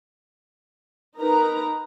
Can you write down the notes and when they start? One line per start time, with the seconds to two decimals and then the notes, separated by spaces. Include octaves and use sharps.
1.19 D#4 A#4 B4 A#5